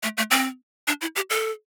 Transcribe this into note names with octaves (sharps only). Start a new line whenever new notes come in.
A3
A3
C4
D4
E4
G4
A4